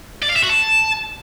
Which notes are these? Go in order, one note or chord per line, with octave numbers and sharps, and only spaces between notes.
D5
F5
E5
F#4
A5